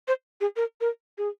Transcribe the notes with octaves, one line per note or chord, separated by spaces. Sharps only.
C5
G#4
A#4
A#4
G#4